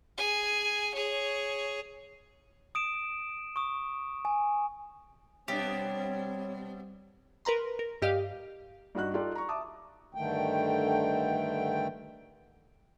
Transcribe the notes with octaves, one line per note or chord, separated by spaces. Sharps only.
G#4 G#5
G#4 C#5
D#6 D7 E7
C#6 D#6
G#5
B2 G3 B3 C4 D4 G4 C#5
A#4 B4 A#5 C6
A#4
G2 G4 D#5 F5
G2 D#4 F#4 F#6
D#4 F4 G4 A4 D5
A#5 C#6
E5 A5 D6 D#6
G2 D3 D#3 A3 G5